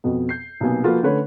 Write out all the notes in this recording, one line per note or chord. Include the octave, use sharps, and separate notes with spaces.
F2 B2 B3
G6 C7
B1 C3 A#3 B3 G#5
F3 A#3 F4 F#4 A4 B4
D3 A3 C#4 B4 C#5